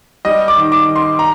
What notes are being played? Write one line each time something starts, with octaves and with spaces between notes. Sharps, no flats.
G3 D#5
D6
D#3
D6
D#3
C6
A#5